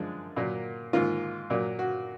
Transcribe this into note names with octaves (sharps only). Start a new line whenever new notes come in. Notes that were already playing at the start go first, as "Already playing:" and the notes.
Already playing: F#2 F3 G#3 D4
A#2 F#3 A#3
G#2 D#3 A#3 F4
A#2 F#3 A#3
F#4